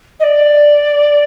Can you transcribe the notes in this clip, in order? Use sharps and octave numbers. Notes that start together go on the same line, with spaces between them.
D#5
D5